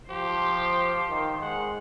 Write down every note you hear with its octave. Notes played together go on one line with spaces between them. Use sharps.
F3 G4 C5
D#3
G#3 F#5